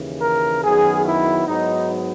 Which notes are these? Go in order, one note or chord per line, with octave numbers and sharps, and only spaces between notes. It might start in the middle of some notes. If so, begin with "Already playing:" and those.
Already playing: D#2 C#3 E3
A#4
F#2 D#3 F#3 B3 G#4
E4
G#2 F#3 B3 D#4